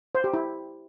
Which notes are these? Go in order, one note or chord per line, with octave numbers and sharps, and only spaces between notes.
C5
G4
E4